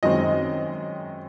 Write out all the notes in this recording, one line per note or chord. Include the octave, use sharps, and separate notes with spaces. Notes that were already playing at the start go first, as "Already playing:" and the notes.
F#2 D#3 G#3 C4 D#5